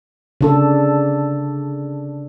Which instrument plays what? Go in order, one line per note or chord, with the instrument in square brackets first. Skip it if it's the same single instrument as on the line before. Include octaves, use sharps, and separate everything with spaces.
[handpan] C#3 D4 A4